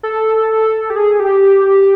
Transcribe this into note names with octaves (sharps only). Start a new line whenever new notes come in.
A4
G4
G#4
G4